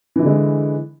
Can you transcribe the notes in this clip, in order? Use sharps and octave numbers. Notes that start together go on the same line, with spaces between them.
D3 E3 G#3 E4